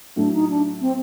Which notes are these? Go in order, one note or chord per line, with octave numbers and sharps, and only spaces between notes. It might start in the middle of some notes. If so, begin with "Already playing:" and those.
A2 F#3 A3 D4
D#4
D4
C4